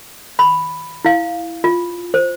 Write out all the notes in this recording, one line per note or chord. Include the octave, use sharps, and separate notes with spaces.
B5
E4 F5
F4
C5